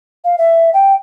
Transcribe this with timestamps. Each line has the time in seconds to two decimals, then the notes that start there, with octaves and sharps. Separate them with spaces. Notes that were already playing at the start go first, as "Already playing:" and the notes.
0.24 F5
0.38 E5
0.74 G5